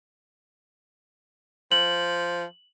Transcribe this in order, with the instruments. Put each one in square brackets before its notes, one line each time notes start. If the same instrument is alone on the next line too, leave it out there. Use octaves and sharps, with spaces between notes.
[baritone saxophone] F3 [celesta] F#7